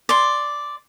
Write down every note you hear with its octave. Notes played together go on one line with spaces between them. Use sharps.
D5 C6